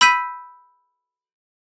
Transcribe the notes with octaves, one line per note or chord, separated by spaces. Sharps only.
B5 E6 G6 B6 D#7